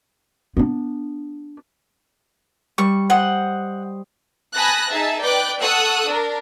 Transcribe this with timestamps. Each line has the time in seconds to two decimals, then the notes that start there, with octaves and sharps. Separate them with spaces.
0.57 B3 D4
2.78 G3 C#6
3.10 C5 D#5 F#5 G5
4.54 G#5 A5 B5 D#6 F#6 A#6
4.88 D#4 G#4 E5 A5
5.21 B4 D5 G5 D6 F#6
5.61 A4 F#5 C#6 D#6 E6 F#6
6.07 D4 A#4